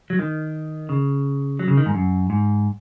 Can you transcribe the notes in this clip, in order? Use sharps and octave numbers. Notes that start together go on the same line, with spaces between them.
F#3
D#3
C#3
F#3
C#3
D#3
G#2
F#2
G#2